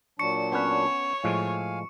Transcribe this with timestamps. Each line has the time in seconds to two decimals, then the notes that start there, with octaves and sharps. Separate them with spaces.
0.19 A#2 F#3 D4 C#6 C#7
0.52 B3 C#4 B4 C#5
1.24 A2 F3 G#3 F5 G#5